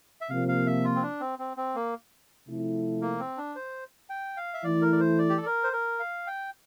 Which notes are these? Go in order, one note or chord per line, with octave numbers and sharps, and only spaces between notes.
E5
C3 F3 A#3 F5
F5
E5
F4
C4
D4
C4
C4
C4
A#3
C3 F3 A3 E4
A#3
C4
D4
C5
G5
F5
E5
E3 A3 E4 D5
A#4
D5
C5
D5
G4
A4
A#4
C5
A#4
F5
G5